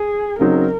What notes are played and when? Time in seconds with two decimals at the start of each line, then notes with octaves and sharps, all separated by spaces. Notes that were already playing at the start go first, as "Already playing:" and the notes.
Already playing: G#4
0.39 C#3 F#3 C4 D#4 A#4